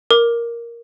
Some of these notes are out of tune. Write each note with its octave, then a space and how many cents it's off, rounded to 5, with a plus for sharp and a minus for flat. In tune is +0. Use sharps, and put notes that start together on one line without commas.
A#4 +5 D6 +0